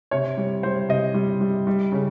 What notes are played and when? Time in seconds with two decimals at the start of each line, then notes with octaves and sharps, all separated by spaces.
0.11 C3 C#5
0.37 G3
0.63 G3 C5
0.89 C3 D#5
1.14 G3
1.41 G3
1.67 G3
1.92 C#3